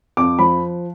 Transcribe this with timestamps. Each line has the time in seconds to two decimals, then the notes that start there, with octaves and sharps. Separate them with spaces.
0.17 F2 D6
0.39 F3 B5